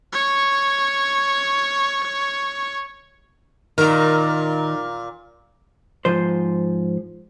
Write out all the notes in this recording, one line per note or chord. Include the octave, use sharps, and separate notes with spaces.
C#5 C#6
A#2 D#3 A#4
G#2 F3 C5